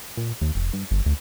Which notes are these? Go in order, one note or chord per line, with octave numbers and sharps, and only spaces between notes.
A#2
D#2
F1
G2
G1
D2